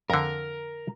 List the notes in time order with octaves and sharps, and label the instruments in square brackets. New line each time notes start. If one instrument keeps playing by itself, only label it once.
[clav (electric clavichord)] F2 D3 [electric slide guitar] A#4